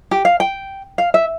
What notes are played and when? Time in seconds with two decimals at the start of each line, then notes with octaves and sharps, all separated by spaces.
0.11 G4
0.25 F5
0.40 G5
0.98 F5
1.14 E5